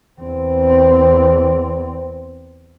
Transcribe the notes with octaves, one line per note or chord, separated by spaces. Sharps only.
E2 C4